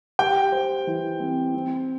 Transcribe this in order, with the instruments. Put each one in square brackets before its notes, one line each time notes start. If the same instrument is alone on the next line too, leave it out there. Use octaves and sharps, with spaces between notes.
[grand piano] G4 [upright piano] G5
[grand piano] C5
E3
C4
C4